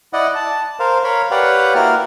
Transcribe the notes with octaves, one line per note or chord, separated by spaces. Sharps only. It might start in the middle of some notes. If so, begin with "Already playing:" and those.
E4 D5 D#5 F#5
A5
A#4 C5 F5
A#4 C#5 F5 B5
G4 B4 C#5 D5 F5 F#5
A#3 E4 F#4 A#4 F6